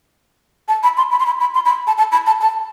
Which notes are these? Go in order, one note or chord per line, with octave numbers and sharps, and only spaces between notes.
A5
B5
C6
B5
C6
B5
B5
C6
B5
A5
A5
B5
A5
A5